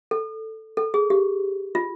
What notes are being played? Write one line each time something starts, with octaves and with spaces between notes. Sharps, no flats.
A4
A4
G#4
G4
F4